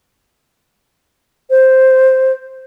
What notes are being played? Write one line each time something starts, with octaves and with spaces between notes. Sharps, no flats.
C5